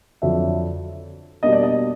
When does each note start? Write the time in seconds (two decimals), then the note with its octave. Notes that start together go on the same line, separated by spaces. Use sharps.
0.22 F2 D3 F#3 E5
1.43 B2 G3 A#3 D4 D#5
1.52 D5
1.63 D#5